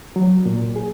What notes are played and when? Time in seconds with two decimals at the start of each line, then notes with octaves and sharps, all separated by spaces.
0.16 F#3
0.46 A#2
0.76 G#4